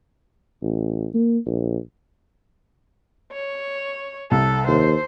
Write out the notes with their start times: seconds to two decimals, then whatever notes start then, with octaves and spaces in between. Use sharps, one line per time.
0.62 A1
1.14 A#3
1.46 A#1
3.33 C#5
4.31 C2 A4
4.67 D#2 C5